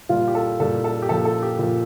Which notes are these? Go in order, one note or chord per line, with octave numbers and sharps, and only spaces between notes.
A#2 G3 F4
G4
A4
A#2 G3 A4
A4
G4
A#2 F3 A4
A4
G4
A#2 F3